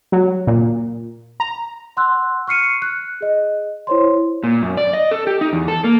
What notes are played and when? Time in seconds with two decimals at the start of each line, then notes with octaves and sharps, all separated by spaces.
0.12 F#3
0.47 A#2
1.40 A#5
1.97 F#5 C6 E6 F#6
2.48 C#6 F6 C7 C#7 D#7
2.82 F#6
3.21 G#4 D#5
3.87 E4 C5 C#5 C6
4.43 A#2
4.62 F#2
4.77 D5
4.94 D#5
5.11 A4
5.27 G4
5.41 D#4
5.53 E2
5.68 A4
5.84 A#3